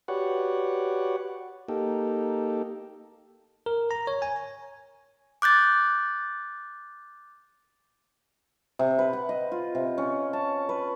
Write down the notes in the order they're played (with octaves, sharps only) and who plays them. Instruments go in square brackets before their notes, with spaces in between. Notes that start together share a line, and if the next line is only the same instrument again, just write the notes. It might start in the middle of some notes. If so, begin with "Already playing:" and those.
[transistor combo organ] F#4 G4 B4 C#5 D5 F#5
A#3 D#4 G4 A4
[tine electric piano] A#4
A#5
C#5
G#5
[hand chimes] D6 F#6 G6 A6
[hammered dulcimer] C3
B4
F#5
D#5
F4
C3
C#4
A5
B4